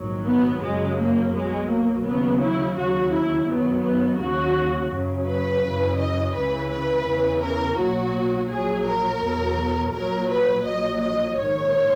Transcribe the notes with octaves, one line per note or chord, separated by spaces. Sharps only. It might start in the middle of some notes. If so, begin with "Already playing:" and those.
Already playing: A#1 G#2 D#3 F#3
B3
F#2 C#3 F#3 G#3
A#3
B1 B2 F#3 G#3
A#3
D#2 C#3 F#3 B3
E4
D#2 C#3 F#3 F#4
E4
F#2 D#3 F#3 B3
B3
D#2 C#3 F#3 F#4
F#2 C#3 F#3
B4
F#2 C#3 E3
D#5
C#2 C#3 E3 B4
B4
E2 C#3 E3
A#4
B1 A#2 F#3 F#4
A#1 A#2 F#3 G#4
A#4
E2 B2 F#3
A#1 A#2 F#3 A#4
B4
A#1 A#2 F#3 D#5
D#5
A#1 G#2 D#3 C#5